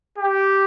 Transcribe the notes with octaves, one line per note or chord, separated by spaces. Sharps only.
G4